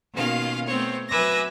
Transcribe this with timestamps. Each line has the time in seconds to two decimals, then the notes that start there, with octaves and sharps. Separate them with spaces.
0.14 B2 D#3 A#3 C#4 F4 F5
0.68 A3 B3 C4 C5 C#5
1.09 F#3 B4 E5 G#5 D6 A#6